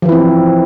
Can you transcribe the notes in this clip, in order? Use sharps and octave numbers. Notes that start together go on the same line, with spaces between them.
E3 F3 C4 E4